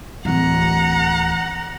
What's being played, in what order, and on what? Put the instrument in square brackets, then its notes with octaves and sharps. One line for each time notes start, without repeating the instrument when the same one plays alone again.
[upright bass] D1 E3 [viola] F#5 A#5